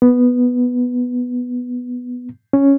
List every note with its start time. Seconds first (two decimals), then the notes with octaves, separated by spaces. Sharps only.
0.02 B3
2.53 C#4